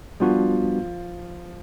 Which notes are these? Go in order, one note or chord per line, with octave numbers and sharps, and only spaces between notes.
F3 G3 B3 D4 F4 F#4